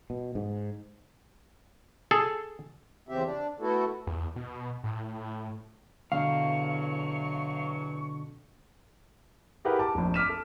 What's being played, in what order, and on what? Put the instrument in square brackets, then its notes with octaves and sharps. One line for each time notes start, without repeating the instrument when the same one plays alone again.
[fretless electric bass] B2
G#2
[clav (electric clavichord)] G#4 A4
[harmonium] E2 C#3 C4 G4 E5
D4
A3 B3 E4 F#4 A4
[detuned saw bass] E2
B2
A2
[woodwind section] E2 F#3 C#6 [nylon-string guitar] B2 D3 [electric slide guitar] F5
[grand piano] E4 G4 G#4 A#4 B4 F#5
A5 D6
F1 A#1
D6 F6 B6 D#7 E7
A4